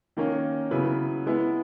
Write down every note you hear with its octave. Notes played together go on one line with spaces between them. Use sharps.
D#3 A#3 C#4
C#3 F#3 B3 E4 B4
G#3 B3 E4